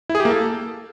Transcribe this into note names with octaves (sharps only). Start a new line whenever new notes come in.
E4
G#4
G4
A#3
A4